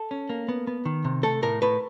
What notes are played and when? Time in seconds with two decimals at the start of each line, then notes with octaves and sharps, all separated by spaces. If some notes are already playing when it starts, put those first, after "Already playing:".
Already playing: A4
0.11 C#4
0.29 A#3
0.49 B3
0.67 B3
0.85 D#3
1.04 C3
1.23 A3 A4
1.42 A2 A#4
1.62 A2 B4